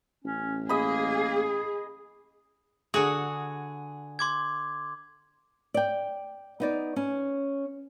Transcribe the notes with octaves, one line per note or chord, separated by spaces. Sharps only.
A1 C#4
A#3 G#4 D#5 B5
D3 F#4 G#4
C6 D6 G#6
D5 G5
B3 D#4 D5
C#4